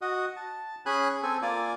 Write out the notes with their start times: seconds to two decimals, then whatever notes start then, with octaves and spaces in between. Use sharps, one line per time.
0.02 F#4 D#5
0.37 A5
0.86 C#4 G#4 G#5 B5 F#6
1.23 C4 A4 G#5
1.42 A#3 F4 D5 G#5